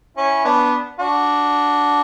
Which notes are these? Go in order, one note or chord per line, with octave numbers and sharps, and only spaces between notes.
C#4 E4
B3 D4
D4 F#4